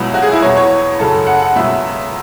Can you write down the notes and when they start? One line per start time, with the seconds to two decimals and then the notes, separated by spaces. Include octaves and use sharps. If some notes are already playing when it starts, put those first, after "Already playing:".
Already playing: C#2 B2 F#3 E4
0.14 F#4
0.22 G#4
0.32 E4
0.42 E2 B2 F#3 C#5
0.57 C#5
0.99 F#2 C#3 F#3 A4
1.27 F#5
1.42 F#5
1.56 C#2 B2 F#3 E5